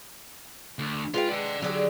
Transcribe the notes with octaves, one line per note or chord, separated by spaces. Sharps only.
D2
G#3 F4 B4 G5
D5 F#5
D3 F#3 G4 G#4